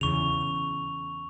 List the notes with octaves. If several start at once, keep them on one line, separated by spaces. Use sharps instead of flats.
E2 C#3 C#6 F7